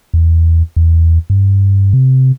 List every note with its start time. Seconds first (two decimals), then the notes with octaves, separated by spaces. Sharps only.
0.14 E2
0.76 E2
1.30 G2
1.93 C3